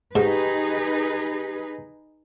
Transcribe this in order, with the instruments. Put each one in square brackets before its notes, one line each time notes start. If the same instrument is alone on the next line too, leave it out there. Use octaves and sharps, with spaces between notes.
[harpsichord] G#2 [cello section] D#4 G#4 B4 [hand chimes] G4